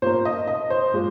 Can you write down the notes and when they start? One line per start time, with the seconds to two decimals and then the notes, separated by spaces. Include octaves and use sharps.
0.02 A#2 C5
0.06 A#3
0.25 D#5
0.48 D#5
0.70 C5
0.93 A#2 G#3